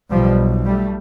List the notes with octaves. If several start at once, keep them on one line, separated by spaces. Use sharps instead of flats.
B1 B2 F3 G3
G3 A3